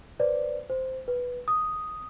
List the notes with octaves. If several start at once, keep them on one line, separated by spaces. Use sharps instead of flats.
B4 C5 D5
C5
B4
D#6